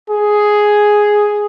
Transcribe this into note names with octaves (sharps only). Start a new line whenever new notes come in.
G#4